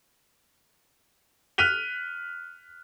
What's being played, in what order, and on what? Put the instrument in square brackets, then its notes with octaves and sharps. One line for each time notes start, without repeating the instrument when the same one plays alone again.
[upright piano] F6 F#6 B6 D#7 F7 G7